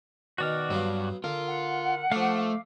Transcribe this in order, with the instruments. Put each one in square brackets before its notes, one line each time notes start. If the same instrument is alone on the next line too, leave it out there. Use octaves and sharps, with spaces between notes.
[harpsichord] B2 D#3 [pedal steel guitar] F#4 D5 F6
[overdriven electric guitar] G2 [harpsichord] F#3 B3 F5
[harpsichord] D3 [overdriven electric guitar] F4 [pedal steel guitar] A#4
[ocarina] F#5
[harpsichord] F3 D4 [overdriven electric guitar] A3 [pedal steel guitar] F5 D6